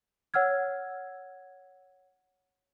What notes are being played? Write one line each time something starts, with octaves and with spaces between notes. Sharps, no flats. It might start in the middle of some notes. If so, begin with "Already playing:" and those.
C#5 F#5 E6 F6 G#6